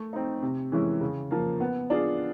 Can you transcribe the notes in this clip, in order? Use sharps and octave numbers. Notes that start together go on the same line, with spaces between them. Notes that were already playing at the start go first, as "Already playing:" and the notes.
Already playing: A3
C4 D#4
C3
E3 G#3 C#4 E4
C#3
F3 A#3
B3
D4 F4 G#4